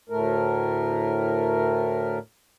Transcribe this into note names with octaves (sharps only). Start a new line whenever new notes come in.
D2 A2 A3 A#4